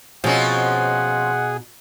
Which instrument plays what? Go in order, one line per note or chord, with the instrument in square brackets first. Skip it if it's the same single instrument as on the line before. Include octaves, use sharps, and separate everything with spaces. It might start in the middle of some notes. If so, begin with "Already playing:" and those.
[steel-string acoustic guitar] B2 D#4 [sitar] F3 C4 C#4 [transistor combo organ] G#4 [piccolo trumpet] F#5